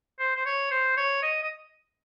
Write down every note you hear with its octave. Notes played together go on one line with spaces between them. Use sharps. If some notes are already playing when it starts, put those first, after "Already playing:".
C5
C5
C#5
C5
C#5
D#5
D#5